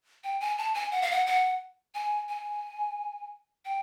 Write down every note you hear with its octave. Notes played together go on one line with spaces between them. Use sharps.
G5
G#5
A5
G#5
F#5
F5
F#5
F#5
G#5
G#5
G5